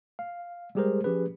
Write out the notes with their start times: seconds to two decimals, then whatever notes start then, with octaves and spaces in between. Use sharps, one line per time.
0.19 F5
0.75 G3 G#3 G4 G#4 A#4 C5
1.04 F3 C#4 G4 G#4 B4